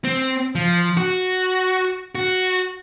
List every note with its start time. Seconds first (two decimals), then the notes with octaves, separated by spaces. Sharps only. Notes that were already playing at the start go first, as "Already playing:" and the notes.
0.04 C4
0.55 F3
0.97 F#4
2.15 F#4